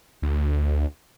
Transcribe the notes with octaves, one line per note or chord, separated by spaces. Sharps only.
D2